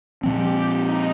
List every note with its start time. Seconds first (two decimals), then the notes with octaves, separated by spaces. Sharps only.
0.23 A#2 F3 C4 G4
0.73 D#4